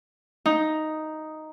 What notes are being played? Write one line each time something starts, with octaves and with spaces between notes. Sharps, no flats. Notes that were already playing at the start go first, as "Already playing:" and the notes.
D#4